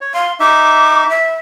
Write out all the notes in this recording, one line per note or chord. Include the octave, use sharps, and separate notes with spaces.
C#5
F5 C6
D#4 E5 D6
E5